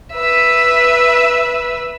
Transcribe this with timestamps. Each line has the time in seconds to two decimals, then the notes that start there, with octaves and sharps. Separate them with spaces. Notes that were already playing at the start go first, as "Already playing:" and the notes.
0.14 B4 E5